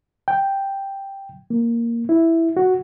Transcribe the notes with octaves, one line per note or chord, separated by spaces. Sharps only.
G5
A#3
E4
F#4